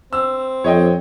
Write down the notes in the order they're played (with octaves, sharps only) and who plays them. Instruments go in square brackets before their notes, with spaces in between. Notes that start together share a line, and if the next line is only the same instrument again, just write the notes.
[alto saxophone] C4 [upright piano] E6
[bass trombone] F2 [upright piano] C#5 D#5 G5